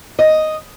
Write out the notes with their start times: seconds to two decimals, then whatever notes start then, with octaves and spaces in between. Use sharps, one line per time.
0.19 D#5